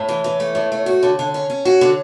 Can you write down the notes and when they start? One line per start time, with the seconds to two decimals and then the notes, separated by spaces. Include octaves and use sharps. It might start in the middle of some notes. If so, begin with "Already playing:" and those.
Already playing: A2 C#5
0.09 E3
0.24 E3
0.40 A3
0.55 A2
0.72 A3
0.86 F#4
1.03 D3
1.19 D3
1.34 C#4 C#5
1.50 C#4
1.65 F#4
1.81 D3